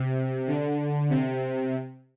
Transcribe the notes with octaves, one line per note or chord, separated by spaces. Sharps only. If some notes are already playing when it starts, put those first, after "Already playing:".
Already playing: C3
D3
C3